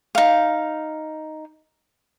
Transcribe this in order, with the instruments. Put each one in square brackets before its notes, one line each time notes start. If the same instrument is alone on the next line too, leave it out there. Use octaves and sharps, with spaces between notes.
[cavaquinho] D#4 F5